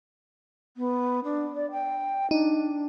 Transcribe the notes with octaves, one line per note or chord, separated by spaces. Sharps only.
B3
D4
D5
G5
D4 D#4